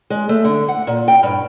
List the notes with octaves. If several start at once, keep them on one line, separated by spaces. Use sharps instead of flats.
G#3
A3
D3
F#5
A#2
G5
G2